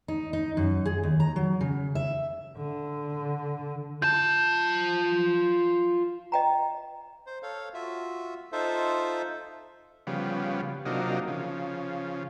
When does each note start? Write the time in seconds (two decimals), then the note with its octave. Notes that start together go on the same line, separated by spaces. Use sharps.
0.08 D#4
0.33 D#4
0.57 F#2
0.85 G#4
1.03 D#2
1.20 A#5
1.36 F#3
1.61 C#3
1.95 E5
2.57 D3
4.02 F4 A5 G6
6.32 D#5 G5 A#5
7.27 C5
7.43 A4 C#5 F5
7.74 F4 F#4 E5
8.52 D#4 F4 A4 C5 E5
10.07 C#3 F3 G3 B3
10.86 C3 F#3 A#3 D4 D#4 F4
11.28 C#3 F3